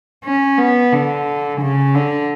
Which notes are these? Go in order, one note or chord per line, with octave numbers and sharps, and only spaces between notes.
C#4
B3
D3
C#3
D3